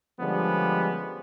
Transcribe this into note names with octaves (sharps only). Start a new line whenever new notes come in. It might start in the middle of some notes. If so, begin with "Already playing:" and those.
D3 F3 G3 G#3 B3 C#4